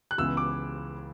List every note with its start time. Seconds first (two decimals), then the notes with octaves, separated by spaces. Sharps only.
0.11 F#6
0.18 C#2 C#3 E3 B3 E4 E6
0.37 D6